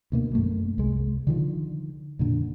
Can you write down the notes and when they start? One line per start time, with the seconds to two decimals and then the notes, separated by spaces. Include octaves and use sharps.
0.12 D2 B2 A#3
0.33 F#2 A3 A#3
0.78 C2 G#3
1.27 D3 D#3 F3
2.19 F2 A#2 D3